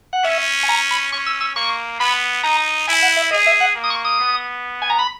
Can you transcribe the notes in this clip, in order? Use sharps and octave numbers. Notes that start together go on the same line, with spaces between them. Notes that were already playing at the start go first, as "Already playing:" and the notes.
F#5
C#4 E5
G#5
A#5
B5
C#4 C#6
E6
E6
A#3 C#6
B3 B5
D#4 A#5
E4 G#5
F#5
E5
G#4 D#5
E5
F#5
A#3
D#6
C#6
D#6
B3
G#5
A#5
B5